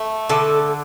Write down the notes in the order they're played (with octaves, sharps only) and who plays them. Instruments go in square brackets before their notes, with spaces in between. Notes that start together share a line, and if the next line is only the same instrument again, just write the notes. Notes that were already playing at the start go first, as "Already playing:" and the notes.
Already playing: [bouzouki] A3
D3 A4